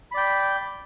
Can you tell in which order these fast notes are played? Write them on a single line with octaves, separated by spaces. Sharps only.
B5 D5 G5